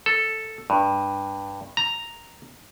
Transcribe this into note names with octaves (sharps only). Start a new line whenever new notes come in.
A4
G2
A#5